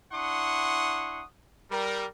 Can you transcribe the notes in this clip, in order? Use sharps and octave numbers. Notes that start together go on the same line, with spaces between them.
D4 E4 F#5 C6 C#6 D#6
G3 A#4